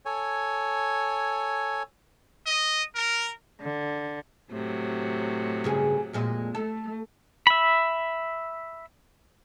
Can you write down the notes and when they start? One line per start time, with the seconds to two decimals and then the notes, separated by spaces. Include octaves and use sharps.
0.06 A4 C#5 G#5
2.47 D#5
2.95 A#4
3.61 D3
4.49 A2 C3 F#3
5.64 G2 C#3 G#4
6.13 F2 A#2 G#3
6.55 A3 A4
7.47 E5 B5